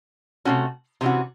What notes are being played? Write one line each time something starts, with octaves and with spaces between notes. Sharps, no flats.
C3 E3 A3 C#4 F#4
C3 E3 A3 C#4 F#4